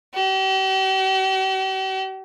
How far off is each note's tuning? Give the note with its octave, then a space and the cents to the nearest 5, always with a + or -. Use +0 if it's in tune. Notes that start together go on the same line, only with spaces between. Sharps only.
G4 -45